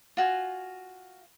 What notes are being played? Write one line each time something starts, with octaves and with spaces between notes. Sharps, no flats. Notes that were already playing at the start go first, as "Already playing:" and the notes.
F4 F#4 G#5